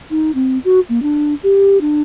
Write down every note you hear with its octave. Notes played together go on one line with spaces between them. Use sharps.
D#4
C4
F#4
A#3
D4
G4
D4